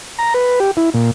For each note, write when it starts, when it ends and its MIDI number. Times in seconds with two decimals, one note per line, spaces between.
0.19 0.34 82
0.34 0.60 71
0.60 0.71 67
0.77 0.90 64
0.94 1.11 46